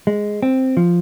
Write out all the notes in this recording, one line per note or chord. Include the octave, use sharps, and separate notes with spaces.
G#3
C4
F3